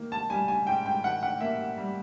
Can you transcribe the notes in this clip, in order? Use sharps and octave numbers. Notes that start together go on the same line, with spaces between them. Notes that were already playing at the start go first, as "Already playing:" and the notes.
Already playing: D#3 A#3
A5
G3 G#5
G#5
G#2 G5
G5
D#3 F#5
F#5
A#3 E5
G3